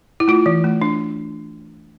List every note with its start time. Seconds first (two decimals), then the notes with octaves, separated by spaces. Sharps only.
0.20 E4
0.28 A3 F4
0.46 E3
0.64 A3
0.82 D4